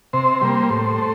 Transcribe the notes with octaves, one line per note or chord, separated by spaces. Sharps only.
C3 C5
G3 A#3
A2
A3